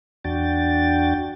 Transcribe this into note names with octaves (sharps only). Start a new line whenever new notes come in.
E2 D4 F#4 G5 A6